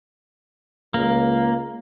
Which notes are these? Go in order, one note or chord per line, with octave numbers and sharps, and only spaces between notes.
C#2 A#3